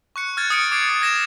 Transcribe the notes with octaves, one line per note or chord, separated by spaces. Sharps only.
C#6 F#6 C#7
F6 F#6 G#6 A6
D#6 C#7 D7
D6 G#6 C7 D7
A6
G#6 A#6 E7